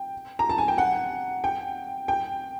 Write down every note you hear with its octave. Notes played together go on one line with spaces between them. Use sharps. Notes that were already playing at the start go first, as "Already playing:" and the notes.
Already playing: G5
A#5
A5
G#5
G5
F#5
G5
G5